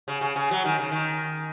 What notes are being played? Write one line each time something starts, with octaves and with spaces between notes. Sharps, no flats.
C#3
C#3
C#3
F#3
D#3
C#3
D#3